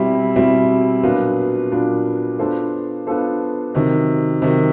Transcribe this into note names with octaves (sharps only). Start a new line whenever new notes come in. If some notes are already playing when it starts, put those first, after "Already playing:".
Already playing: B2 G3 C4 E4
B2 G3 C4 E4
A#2 F#3 B3 D4 F4
A#2 F#3 B3 D4 F4
B3 D4 F4 A4 C5
B3 D4 F4 A4 C5
C3 D#3 F#3
C3 D#3 F#3